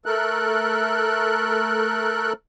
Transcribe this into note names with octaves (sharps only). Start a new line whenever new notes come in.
A3 A4 A#4 F#6